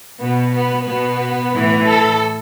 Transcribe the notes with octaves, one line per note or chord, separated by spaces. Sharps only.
B2 B3
B3
B2 B3
A2 E3
A4